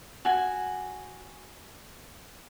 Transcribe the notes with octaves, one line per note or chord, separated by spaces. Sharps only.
F#4 G#5